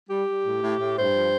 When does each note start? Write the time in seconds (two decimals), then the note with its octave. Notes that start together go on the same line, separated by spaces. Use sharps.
0.10 G3 G4
0.27 G3
0.45 A2
0.63 A2
0.80 A2
0.98 G2 C5
1.15 F3